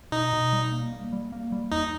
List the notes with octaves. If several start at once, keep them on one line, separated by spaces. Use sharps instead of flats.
B2 D#4
B2
G3
A#3
A#3
G3
A#3
G3
E2 D#4